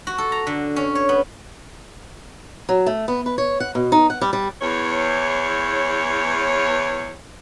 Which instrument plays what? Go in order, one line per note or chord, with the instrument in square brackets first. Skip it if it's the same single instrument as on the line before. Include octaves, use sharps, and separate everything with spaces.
[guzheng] F#4
A4
A#5
D3
C#4
C#5
B3
[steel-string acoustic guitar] F#3
A3
B3
B4
C#5
F#5
B2
D#4
F#5
G3
G3
[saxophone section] E2 C#5